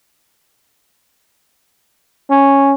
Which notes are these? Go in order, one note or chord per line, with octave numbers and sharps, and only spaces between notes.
C#4